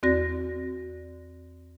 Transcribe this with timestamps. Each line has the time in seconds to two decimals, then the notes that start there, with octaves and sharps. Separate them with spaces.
0.03 E2 C4 F#4 D5 A#6